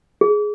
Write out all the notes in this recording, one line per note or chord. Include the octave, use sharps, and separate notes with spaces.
G#4